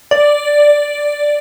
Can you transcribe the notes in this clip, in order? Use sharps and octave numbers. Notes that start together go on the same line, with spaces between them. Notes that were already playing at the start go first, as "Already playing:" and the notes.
D5